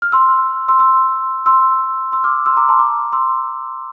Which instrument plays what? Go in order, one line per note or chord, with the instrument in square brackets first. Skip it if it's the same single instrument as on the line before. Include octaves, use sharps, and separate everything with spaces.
[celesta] F6
C6 E6
C6 E6
C6 E6
C6 E6
C6 E6
D6 F6
C6 E6
A#5 D6
A5 C6
A#5 D6
C6 E6